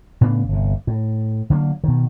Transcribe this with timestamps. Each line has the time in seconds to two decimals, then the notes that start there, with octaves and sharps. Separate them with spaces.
0.21 A2 C#3 B3 D4
0.49 G1 C3
0.87 A2
1.50 D3 F#3 G#3 A#3
1.84 B2 D#3